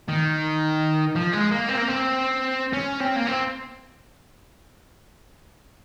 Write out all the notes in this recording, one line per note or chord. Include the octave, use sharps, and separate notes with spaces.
D#3
F3
G#3
A#3
C4
A#3
C4
C#4
C4
A#3
C4